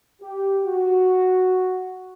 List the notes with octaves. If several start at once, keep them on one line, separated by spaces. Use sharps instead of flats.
G4
F#4